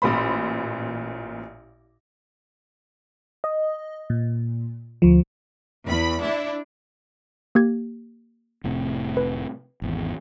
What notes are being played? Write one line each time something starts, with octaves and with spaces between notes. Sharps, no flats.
A1 A#2 C5 B5
D#5
A#2
D2 F3
E2 B5
D4 E4
A#3 G4 G#6
F1 A2 C3
B4
G#1 E2